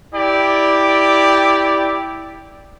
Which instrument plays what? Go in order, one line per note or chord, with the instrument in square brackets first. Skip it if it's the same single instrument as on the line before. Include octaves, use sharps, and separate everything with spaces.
[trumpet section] E4 G4 D5